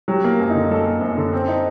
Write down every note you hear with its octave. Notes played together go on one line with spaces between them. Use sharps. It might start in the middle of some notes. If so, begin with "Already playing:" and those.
F#3 G4
A#3
F#2
D#4
D3
F#3 A4
A#3
F#2
D3
C4
D#4